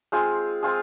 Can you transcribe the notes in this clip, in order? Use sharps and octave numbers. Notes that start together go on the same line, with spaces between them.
G#3 C4 F4 G#4
G#3 C4 F4 G#4